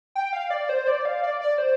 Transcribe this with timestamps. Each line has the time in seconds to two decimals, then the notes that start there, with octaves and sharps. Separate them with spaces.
0.15 G5
0.33 F5
0.50 D5
0.69 C5
0.87 D5
1.05 F5
1.23 D5
1.41 D5
1.58 C5